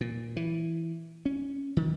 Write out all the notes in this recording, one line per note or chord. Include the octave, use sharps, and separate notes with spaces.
A#2
E3
C#4
D#3